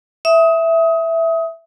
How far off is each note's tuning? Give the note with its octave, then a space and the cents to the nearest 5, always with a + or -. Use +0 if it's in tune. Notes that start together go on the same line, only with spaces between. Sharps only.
E5 +0 D#6 +25